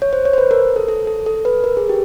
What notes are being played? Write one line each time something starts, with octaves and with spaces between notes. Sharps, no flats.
C#5
C5
C#5
C5
B4
A#4
A4
A4
A4
A4
B4
A#4
G#4
G4